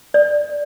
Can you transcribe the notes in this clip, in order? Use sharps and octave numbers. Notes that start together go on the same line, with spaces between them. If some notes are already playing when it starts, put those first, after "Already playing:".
D5